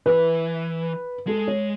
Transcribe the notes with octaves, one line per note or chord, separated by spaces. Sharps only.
E3 B4
G#3 A4
C#5